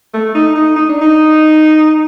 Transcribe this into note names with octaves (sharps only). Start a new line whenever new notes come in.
A3
D#4
D#4
D#4
D4
D#4